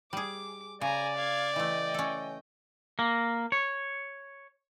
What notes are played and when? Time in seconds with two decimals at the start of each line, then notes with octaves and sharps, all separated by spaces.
0.13 G3 G#4 D6
0.81 C#3 D5 G#5 A#5
1.17 F5 G#6
1.56 E3 A3 D#5 G5
1.94 C#4 A4
2.99 A#3
3.52 C#5